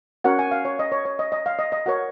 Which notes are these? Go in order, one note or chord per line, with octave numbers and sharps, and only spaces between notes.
C#4 F#4 A#4 C#5 F#5
G#5
F5
C#5
D#5
C#5
C#5
D#5
D#5
F5
D#5
D#5
F#4 A#4 C#5 F#5